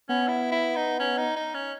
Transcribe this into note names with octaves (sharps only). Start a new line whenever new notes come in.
B3 C#4
E4
E4
D#4
C#4
D#4
D#4
C#4